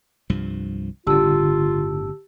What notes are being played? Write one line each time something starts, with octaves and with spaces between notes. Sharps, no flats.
C2 G2 F3
G1 A2 D3 F4 G4 A5 E6